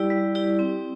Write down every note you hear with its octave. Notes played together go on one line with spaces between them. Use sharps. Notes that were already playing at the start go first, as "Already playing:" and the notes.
Already playing: G3 E4 G4 D5
G3
E4 G4 D5
C4